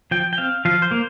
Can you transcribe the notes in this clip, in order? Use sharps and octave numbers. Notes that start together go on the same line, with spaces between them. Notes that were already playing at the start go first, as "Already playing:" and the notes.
F3 G5
G5
C4 F5
F3 F5
C5
A#3